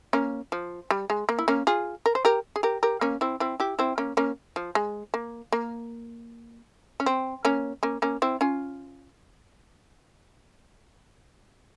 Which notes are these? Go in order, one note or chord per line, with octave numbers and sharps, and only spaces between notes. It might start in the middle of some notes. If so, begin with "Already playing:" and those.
A#3 C#4
F3
G3
G#3
A#3
E4
A#3 C#4
F4 G#4
A#4
C5
G4 A#4
G#4
G4 A#4
G4 A#4
A#3 C#4
C4 E4
C4 E4
E4 G4
C4 E4
A#3 C#4
A#3 C#4
F3
G#3
A#3
A#3
C#4
C4
A#3 C#4
A#3 C#4
A#3 C#4
C4 E4
C#4 F4